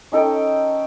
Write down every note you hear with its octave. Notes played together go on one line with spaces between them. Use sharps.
C#4 D#4 A4 G5